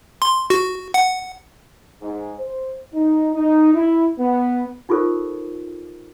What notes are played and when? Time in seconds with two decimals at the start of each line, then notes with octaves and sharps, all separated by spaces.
0.22 C6
0.50 F#4
0.94 F#5
2.02 G#2
2.39 C5
2.94 D#4
3.35 D#4
3.74 E4
4.19 B3
4.89 D#4 F4 G4 A4 A#4 C5